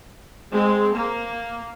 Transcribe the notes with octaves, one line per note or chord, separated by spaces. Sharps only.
G#3 C4
A#3